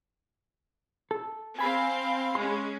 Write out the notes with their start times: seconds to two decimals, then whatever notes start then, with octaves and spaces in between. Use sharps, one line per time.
1.11 A4
1.59 C4 F5 G#5 B5
2.35 G#3 C#4 C6